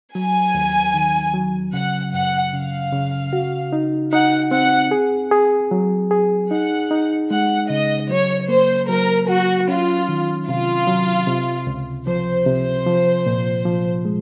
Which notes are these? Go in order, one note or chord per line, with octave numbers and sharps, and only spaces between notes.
F#3 G#5
D#2
D#3
F#3
C#3 F#5
F#2 F#5
C#3 F5
C#3
F#4
D#4
D#4 F#5
C4 F#5
G#4
G#4
F#3
G#4
D#4 F#5
D#4
G#3 F#5
C#3 D#5
F#3 C#5
A#3 C5
F#3 A#4
F#3 F#4
C#4 F4
D#3
C3 F4
F#3
C3
C#2
F3 C5
C3 C5
F3
A#2
F3
G#3